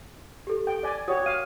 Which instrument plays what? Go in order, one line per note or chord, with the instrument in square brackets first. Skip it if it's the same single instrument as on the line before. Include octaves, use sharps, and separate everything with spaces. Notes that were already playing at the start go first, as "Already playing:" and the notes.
[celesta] G4 A4
[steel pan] G5
D5 G#5
[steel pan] F#4 G4 C#5 [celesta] D#6
[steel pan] F5 [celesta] D#7